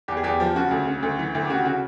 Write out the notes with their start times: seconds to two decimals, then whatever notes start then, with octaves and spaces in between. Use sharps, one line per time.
0.08 E2 G4
0.17 G#4
0.24 E2 G4
0.40 F3
0.55 C#3 F#4
0.71 D2
0.87 C#3
1.03 D2
1.19 E3
1.35 D2
1.45 G4
1.49 C#3 F#4
1.65 C#3 F#4